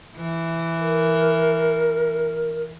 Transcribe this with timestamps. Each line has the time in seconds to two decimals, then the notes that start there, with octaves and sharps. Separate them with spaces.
0.16 E3
0.79 A#4